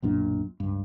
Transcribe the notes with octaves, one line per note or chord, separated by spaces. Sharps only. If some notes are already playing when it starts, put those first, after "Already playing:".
B1 F#2 A#2 D4
C#2 G2